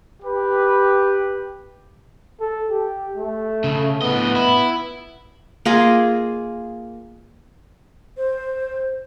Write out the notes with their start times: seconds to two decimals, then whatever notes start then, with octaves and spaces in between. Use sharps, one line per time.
0.22 G4 B4
2.40 A4
2.70 G4
3.16 A3
3.64 C#3
4.02 A2 B3 D#5
4.36 E4
5.65 A#3 F4 G#4 D#5
8.17 C5